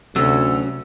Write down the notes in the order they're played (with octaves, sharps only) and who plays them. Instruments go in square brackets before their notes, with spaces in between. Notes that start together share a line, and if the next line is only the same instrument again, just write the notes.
[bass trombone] D2 [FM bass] C3 [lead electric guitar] F#3 C#4 [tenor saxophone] A4